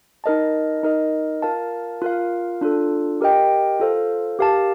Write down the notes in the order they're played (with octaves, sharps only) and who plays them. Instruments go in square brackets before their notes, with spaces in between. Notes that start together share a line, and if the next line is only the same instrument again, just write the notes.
[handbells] D#4 A#4 D#5 A5
D#4 A#4 D#5
F4 A#4 F5 A5
F4 A#4 F5
D4 F4 A4
G4 A#4 D#5 G5
F4 A4 C5 F5
G4 A#4 F5 A5